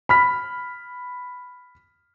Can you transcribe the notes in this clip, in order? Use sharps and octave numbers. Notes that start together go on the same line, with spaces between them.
B5 F6 B6